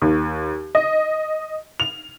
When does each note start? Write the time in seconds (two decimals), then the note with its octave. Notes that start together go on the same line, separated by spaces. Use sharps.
0.02 D#2
0.75 D#5
1.80 F7